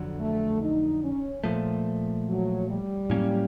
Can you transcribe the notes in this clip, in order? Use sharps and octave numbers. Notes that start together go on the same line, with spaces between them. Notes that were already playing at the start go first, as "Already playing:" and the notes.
Already playing: F2 D3 F#3
A3
D#4
C#4
A#2 F3 A3
F#3
G3
A2 F#3 A#3 C#4